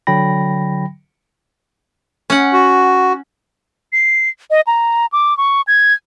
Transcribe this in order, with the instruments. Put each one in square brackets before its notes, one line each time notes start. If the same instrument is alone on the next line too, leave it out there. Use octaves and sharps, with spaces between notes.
[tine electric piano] D3 F#3 G5 B5 A#6
[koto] C#4 F#5
[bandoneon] F#4
[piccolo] C7
D#5
A#5
D6
C#6
G#6